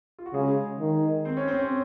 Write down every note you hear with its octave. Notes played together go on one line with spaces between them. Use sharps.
F4
F#4
C#3 G#3 G#4
D#3
C4 C5
C#4 C#5
C4 C5
C#4 C#5